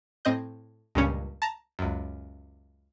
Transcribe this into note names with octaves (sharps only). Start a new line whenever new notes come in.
A2 C4 D#5 G6
C#2 G2 A#2 C#3 C#4
A5 A#5
C#2 F#2